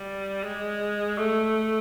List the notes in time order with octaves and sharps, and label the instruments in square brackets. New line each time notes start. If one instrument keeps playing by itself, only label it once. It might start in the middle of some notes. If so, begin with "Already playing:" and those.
Already playing: [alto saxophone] G3
G#3
A3